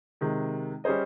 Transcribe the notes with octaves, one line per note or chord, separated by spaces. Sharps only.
C3 D#3 G#3
G3 C#4 G#4 C5 D#5